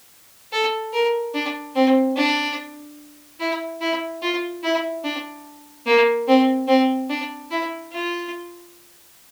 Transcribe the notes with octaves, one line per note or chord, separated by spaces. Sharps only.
A4
A#4
D4
C4
D4
E4
E4
F4
E4
D4
A#3
C4
C4
D4
E4
F4